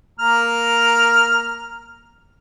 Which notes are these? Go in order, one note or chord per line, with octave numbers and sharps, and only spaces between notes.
A#3 A#5 F6